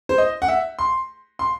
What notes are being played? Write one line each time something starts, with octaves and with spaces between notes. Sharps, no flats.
C5
D#5
F#5
E5
C6
C6